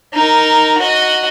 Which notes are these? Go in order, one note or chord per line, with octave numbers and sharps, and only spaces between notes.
D#4 A#4
F#4 D#5